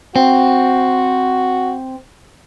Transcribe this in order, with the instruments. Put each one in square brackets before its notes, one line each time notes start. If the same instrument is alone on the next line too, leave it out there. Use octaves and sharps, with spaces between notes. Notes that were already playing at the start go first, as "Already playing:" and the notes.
[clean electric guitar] C4 [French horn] F#4